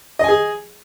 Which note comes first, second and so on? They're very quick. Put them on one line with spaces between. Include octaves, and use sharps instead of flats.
D#5 G#5 G#4